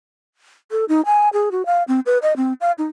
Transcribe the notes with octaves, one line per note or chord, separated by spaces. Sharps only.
A4
D#4
G#5
G#4
F#4
F5
C4
B4
D#5
C4
F5
D#4